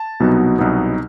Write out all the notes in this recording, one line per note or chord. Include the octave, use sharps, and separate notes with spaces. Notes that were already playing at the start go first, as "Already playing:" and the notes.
Already playing: A5
C2 B2 F#3 B3 D#4
C2 B2 F#3 B3 D#4